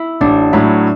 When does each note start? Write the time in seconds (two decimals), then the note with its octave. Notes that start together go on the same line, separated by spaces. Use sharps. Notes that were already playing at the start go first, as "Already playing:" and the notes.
Already playing: E4
0.21 A1 D4
0.53 A2 F#3 E4